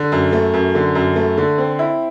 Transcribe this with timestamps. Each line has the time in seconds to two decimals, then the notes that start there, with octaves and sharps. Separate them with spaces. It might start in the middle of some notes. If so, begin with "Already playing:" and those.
Already playing: D3
0.12 F#2
0.33 A3
0.54 F#2
0.75 D3
0.95 F#2
1.16 A3
1.37 D3
1.58 C4
1.79 E4